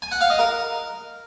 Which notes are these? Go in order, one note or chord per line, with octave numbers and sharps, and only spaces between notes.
G#5
F#5
F5
D#5
A#4